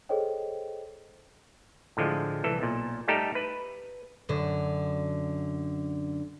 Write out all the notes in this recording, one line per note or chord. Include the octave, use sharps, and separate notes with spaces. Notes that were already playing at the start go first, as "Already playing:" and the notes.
G#4 A4 C5 C#5 D#5 G5
A2 D3 F3 G#3
C2 E3 A4
B1 A#2
G3 A3 D#4 G4 A4 A#4
B4
F#2 D3